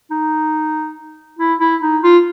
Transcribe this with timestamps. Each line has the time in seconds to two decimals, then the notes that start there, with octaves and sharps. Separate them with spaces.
0.11 D#4
1.39 E4
1.60 E4
1.82 D#4
2.03 F4